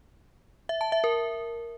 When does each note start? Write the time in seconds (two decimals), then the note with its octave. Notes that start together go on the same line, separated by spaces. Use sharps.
0.69 E5
0.81 A5
0.92 E5
1.04 A#4